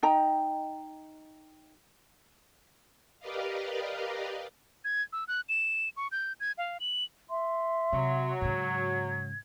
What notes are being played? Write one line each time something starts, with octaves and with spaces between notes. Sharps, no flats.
D#4 D#5 G5 A#5
G4 A#4 B4 D5 D#5 F5
G#6
E6
F#6
E7
C#6
G6
G#6
F5
F#7
E5 C6
C3 F#3
G#2 C#3 G#6